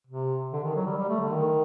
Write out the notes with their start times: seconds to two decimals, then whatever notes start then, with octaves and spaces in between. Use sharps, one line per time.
0.07 C3
0.53 D3
0.64 D#3
0.76 F#3
0.86 G3
0.97 G3
1.09 A3
1.21 D3
1.32 D#3